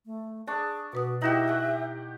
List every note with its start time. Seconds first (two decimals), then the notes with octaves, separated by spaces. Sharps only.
0.06 A3
0.47 D4 G#4 C#6
0.93 B2 F#4 B4 D#6
1.22 D#4 E4 F#4 G4 E5 G5
1.48 G4 F#5